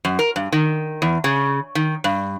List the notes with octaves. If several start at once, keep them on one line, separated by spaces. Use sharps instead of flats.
F#2
A#4
G2
D#3
E2
C#3
D#3
G2